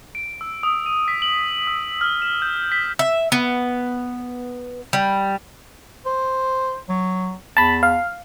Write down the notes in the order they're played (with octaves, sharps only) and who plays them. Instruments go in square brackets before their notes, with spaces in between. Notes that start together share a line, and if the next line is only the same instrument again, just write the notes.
[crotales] D7
E6
D#6
D#7
B6
F#7
E6
F6
E7
G6
B6
[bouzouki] E5
B3
G3
[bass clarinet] C5
F#3
[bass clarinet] E2 [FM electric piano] A5 B5
[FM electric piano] F5